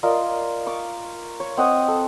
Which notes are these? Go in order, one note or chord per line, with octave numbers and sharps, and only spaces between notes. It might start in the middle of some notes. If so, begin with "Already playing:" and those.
F4 A#4 D5 D#5
C#6 D6
C#5
C4 D#5 F#5 D#6
A4